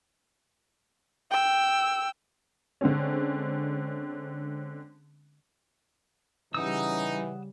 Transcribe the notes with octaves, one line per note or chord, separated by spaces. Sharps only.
G5 E6
D3 G#3 C4 C#4
C#3 E3 G3 D#4 F#5 D#6 E6